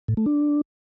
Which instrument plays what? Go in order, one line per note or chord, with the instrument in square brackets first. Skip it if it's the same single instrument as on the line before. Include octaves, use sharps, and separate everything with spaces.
[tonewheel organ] A2
A3
D4